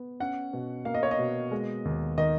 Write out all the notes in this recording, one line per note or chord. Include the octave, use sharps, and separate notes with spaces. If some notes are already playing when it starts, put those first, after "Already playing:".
Already playing: B3
C#4 F#5
B2
A#3 F5
D#5
C#5
D#5
B2
G#3
D#2
D#3 D#5